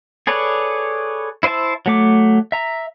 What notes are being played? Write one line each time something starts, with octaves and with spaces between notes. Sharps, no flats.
G#4 A4 B4 C#5 D5
E4 C5 D#5 E5 A5
F#3 A3 D6
E5 A#5